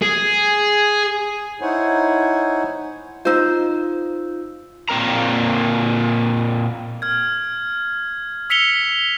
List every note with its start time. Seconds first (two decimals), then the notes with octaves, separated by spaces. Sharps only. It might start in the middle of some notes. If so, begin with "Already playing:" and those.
0.02 G#4
1.61 D#4 E4 C5 C#5 F#5 G#5
3.25 D#4 F4 C5 E6
4.89 A#2 A#3 C4 A#4 A#5
7.02 F6 G#6
8.50 E6 B6 C#7 F7 G7